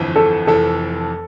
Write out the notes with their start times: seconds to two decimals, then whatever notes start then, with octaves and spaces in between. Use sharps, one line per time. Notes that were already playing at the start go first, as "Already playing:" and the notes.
Already playing: G1 F2 E3
0.16 A4
0.47 F1 F2 E3 A4